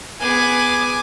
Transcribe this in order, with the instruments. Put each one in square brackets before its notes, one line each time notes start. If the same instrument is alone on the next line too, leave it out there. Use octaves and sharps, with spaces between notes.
[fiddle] B3 G#4 [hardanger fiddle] G#5 D6